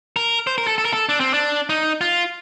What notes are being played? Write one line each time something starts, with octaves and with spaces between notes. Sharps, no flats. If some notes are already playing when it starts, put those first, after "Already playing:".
A#4
C5
A#4
A4
A4
A#4
A4
D4
C4
D4
D#4
F4